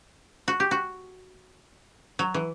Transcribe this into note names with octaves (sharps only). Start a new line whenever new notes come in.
F#4
G4
F#4
F#3
E3